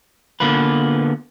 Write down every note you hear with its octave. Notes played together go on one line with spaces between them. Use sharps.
D3 A#3 B3 F4 B4